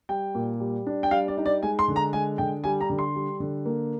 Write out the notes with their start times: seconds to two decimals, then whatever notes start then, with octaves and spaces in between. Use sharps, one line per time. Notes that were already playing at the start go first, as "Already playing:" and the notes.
0.09 G3 G5
0.35 A#2
0.60 G3
0.87 D4
1.03 G5
1.11 G3 F5
1.28 D5
1.38 D#4
1.46 D5
1.62 G#3 G#5
1.79 C6
1.88 D3
1.96 A#5
2.13 G#3 G#5
2.38 D3 G5
2.64 G3 G#5
2.81 A#5
2.90 D3
2.99 C6
3.16 G3
3.40 D3
3.66 A#3